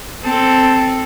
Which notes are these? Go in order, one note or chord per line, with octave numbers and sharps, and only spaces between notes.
C4 A4